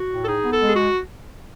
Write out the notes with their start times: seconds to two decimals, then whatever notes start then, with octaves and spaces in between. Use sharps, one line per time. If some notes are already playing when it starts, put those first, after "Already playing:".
Already playing: F#4
0.09 A2
0.22 A4
0.26 D#4 G#4
0.44 B3
0.50 A4
0.61 G#3
0.68 G#4
0.74 F#4